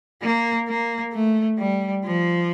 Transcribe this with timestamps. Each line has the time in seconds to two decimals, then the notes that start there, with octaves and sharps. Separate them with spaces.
0.22 A#3
0.68 A#3
1.13 A3
1.58 G3
2.05 F3